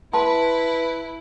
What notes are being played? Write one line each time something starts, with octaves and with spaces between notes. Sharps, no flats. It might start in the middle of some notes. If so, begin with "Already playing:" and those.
E4 B4 A5 C6